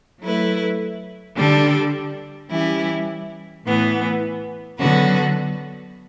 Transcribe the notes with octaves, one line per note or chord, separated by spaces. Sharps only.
F#3 A3 E4 B4
D3 G3 D4 A4
E3 G3 C#4 E4 G4
A2 E3 B3
D3 F#3 B3 F#4 B4